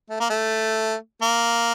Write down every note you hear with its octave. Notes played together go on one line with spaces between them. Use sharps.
A3
A#3
A3
A#3